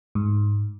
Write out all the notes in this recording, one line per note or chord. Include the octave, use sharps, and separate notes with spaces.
G#2